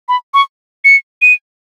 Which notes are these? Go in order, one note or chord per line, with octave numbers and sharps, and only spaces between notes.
B5
C#6
C#7
D#7